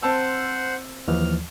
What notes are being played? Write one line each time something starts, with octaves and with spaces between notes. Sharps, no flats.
C4 C5 F#5 A5 E6
D#2 E3 F3 F6